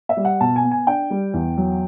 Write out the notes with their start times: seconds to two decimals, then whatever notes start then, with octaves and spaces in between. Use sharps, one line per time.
0.09 E5
0.17 G3
0.25 F#5
0.41 B2 A5
0.56 G#5
0.64 B3
0.71 G#5
0.87 D4 G5
1.10 G3
1.34 E2
1.57 F#3